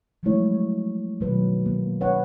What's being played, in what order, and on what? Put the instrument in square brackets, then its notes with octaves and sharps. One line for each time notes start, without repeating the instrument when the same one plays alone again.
[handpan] F3 F#3 G#3 A3 E4 C#5
B2 D#3 F#3 B4
A#3
B4 C#5 F#5